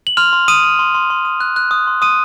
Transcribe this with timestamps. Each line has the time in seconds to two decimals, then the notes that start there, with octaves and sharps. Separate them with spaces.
0.07 F#7
0.17 C6 F6 F7
0.33 C6
0.48 D#6 D#7
0.64 D#6
0.79 C6
0.95 C6
1.10 C6
1.25 D#6
1.41 F#6
1.56 F#6
1.71 D#6
1.87 C6
2.02 C6 D#6 D#7